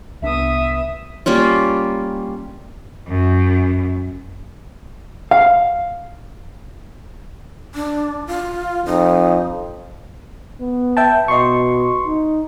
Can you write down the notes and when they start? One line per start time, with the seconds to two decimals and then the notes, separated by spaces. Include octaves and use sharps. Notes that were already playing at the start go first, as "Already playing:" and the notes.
0.22 C2 B3 D4 E5 D#6
1.26 G3 A#3 C#4 F4
3.07 F#2
5.31 F5
7.75 D4
8.27 F4
8.86 F2 D#4
10.61 B3
10.97 E5 G5 A5
11.28 B2 D#5 C6 C#6
12.06 D#4